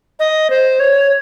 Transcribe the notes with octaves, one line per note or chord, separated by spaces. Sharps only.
D#5
C5
C#5